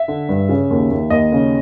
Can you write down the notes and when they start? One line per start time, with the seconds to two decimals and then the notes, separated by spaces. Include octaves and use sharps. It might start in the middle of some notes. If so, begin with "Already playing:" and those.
Already playing: E5
0.08 D3
0.29 G2
0.49 C#3
0.70 D#2
0.91 D#2
1.10 D#2 D#5
1.32 C#3